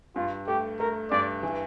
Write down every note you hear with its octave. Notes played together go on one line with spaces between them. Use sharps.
G2 F4
A3 G4
A3 A#4
G2 D5
E3